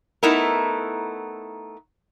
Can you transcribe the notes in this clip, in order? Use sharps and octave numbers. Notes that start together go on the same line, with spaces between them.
A3 B3 D#4 E4 A#4